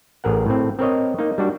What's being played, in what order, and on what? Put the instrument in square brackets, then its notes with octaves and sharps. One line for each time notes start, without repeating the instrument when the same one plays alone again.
[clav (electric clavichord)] A1 G#4 A#4 F#5
A2 C4
C4 A#4 C#5 D#5
A#3 D#4
G3 D4 F#4